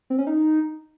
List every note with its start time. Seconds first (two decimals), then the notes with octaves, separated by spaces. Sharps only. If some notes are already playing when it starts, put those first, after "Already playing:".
0.10 C4
0.18 C#4
0.27 D#4